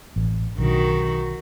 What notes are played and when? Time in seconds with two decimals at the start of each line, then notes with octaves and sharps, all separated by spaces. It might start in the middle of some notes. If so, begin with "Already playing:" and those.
0.16 A1
0.58 B1 D3 D#3 F#4